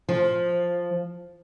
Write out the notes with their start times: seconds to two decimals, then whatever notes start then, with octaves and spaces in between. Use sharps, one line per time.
0.08 F3